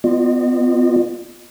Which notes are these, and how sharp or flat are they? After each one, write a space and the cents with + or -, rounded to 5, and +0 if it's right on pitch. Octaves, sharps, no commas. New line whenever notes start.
B3 +25 F4 +0 D#5 -40